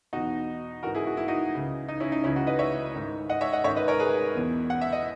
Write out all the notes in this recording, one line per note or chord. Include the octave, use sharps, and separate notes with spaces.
E2 B2 D#4 F#4
G#2 E3 F#4 A#4
E4 G#4
F#4
E4
D#4 F#4
C#2 C#3 E3
D#4
C#4 E4
D#4
C#2 C#3 E3 C#4 E4
D#4 F#4
B4 D#5
C#5 E5
G#2 D#3
D#5 F#5
C#5 E5
D#5 F#5
G#2 D#3 C#5 E5
B4 D#5
A#4 C#5
G#4 B4
E2 B2
F#5
E5
D#5